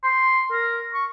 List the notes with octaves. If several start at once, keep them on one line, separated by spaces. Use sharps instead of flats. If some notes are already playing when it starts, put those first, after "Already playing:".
C6
A#4
C#6